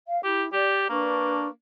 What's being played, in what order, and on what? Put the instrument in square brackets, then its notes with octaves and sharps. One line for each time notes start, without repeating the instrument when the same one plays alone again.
[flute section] F5
[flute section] E4 [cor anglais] G4
[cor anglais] G4 [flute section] D5
[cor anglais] A#3 [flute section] D4 B4 C#6